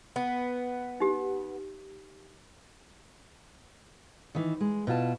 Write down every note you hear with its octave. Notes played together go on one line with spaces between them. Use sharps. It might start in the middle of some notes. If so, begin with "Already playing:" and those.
B3
D#4 G4
D#3 E3
G#3
B2 E4 F4 A5